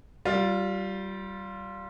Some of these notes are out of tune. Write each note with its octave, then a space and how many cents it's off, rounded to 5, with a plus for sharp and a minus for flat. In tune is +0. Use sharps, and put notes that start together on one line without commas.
G3 -20 F4 +5